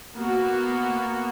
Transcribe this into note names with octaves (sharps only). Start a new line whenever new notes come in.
A#3 B3 F#4